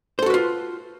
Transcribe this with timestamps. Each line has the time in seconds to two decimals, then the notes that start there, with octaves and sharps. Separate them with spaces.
0.19 C5
0.22 A4
0.26 F#4
0.30 B4
0.34 F4